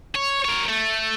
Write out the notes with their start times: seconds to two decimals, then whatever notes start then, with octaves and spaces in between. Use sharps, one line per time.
0.15 C#5
0.44 A#4 C#5
0.69 A3